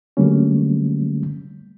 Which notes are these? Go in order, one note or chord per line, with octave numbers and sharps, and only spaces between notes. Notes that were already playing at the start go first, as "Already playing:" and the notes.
D3 F#3 G3 A3 A#3 C#4